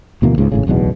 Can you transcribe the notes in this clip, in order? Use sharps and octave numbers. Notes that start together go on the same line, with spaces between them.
D2 B2 E3 A#3
C#2 G#2 C#3
G#1 A2 C#3
D1 B1 E2 B2